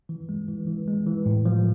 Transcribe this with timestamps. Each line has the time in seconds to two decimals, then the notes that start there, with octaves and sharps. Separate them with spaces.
0.09 E3
0.29 G#3
0.48 E3
0.67 E3
0.88 G#3
1.07 E3
1.26 A2
1.45 F3